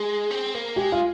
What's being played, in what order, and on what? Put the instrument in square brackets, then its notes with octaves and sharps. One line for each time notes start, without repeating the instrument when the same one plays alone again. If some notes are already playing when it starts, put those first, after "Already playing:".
Already playing: [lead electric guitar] G#3 [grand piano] G#4
[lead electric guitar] C4
A#3
[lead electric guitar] G#3 [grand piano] G4
[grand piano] F4